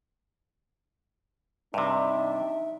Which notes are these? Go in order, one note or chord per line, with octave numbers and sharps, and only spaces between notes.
G2 C3 D4 D#4 D5 E5